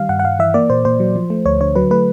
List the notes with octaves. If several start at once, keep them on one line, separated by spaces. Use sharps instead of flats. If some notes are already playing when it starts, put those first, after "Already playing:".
Already playing: D#3 G3 F5
G2 F#5
F#5
G2 F5
E3 E5
A#3 D5
A#2 C5
A#2 C5
F#3
F3
A3
D2 C#5
D3 C#5
F#3 B4
A3 B4